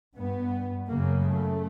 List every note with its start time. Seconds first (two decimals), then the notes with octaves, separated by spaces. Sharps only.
0.17 G2 B3
0.88 F#2 C#3 A#3
1.24 A3